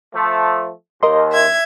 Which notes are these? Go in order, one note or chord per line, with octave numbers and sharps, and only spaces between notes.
F3 A3
D#2 A#4 D#5 C6
E5 G#6